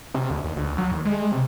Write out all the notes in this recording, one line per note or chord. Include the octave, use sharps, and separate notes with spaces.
C3
D2
D#2
D2
F#3
D#2
G#3
C3